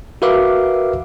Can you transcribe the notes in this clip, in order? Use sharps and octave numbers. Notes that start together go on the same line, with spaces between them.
F#4 A#4 B4 E5 F5 D6